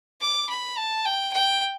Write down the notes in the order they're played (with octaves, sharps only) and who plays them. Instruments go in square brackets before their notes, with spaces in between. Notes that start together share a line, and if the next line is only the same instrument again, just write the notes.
[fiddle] D6
B5
A5
G5
G5